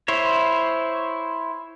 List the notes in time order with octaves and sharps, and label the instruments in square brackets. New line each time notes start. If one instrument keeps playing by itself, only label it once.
[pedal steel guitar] E4 C5 C#5